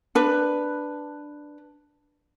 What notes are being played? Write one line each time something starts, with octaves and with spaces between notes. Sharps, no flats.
D4 B4